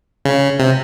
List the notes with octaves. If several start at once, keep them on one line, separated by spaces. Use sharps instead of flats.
C#3
C3